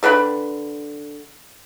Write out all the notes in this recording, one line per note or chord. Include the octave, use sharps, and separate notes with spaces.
D3 B4 G5 B5